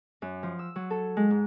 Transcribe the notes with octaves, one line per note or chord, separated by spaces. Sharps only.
F#2
F3
E6
F#3
A4
G#3
G#2